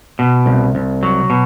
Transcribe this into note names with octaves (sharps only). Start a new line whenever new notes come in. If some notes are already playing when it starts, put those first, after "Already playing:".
B2
C2
C2
F#3
B2